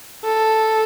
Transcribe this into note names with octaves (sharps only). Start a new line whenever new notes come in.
A4